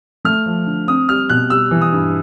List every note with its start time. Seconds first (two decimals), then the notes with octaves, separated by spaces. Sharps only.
0.25 A3 F6
0.46 F3
0.67 D3
0.88 C4 D#6
1.09 G3 F6
1.29 B2 F#6
1.50 G3 E6
1.71 E3
1.81 D#6
1.93 G2